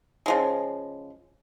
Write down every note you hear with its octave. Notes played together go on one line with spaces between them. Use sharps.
C#3 F3 G#3